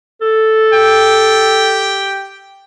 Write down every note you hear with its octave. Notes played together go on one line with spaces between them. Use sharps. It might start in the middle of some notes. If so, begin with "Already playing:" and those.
A4
G4 G5